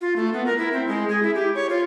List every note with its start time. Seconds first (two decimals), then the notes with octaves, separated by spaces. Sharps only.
0.01 F4
0.16 A3
0.33 B3
0.46 A#4
0.58 E4
0.73 C4
0.87 G#3
1.09 G#4
1.23 E4
1.35 G4
1.55 C#5
1.70 F4